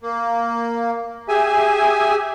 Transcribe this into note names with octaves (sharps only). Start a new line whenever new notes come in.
A#3
G4 G#4 E5 G#5